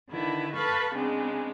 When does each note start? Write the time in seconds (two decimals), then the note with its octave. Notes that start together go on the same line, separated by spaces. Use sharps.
0.11 D3 D#3 E4 B4
0.55 A4 B4 F5 B5 C#6
0.95 C#3 G#3 B3 C4 D4